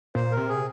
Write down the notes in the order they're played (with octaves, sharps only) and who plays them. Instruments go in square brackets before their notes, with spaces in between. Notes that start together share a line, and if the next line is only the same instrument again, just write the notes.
[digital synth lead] A#2 [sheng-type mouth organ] C5
[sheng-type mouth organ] A#4
[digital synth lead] C3
[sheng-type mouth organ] G#4